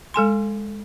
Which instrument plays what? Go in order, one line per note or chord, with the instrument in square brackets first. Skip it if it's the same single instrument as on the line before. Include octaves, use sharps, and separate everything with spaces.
[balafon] G#3 A4 G#5 C6